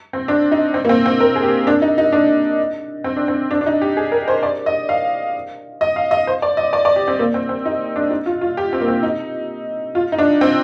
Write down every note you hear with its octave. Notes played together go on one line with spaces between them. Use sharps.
C4
D4
D#4
C4
A#3
C4
C4
A#4
G#4
G4
D4
D#4
D#4
D4
C4
D4
C4
D4
D4
D#4
G4
G#4
A#4
C5
D5
D#5
F5
D#5
F5
D#5
C5
D5
D#5
D5
D5
G4
C4
A#3
C4
C4
D#4
D4
D#4
F4
F4
G4
C4
A#3
C4
D#4
F4
D#4
D4
C4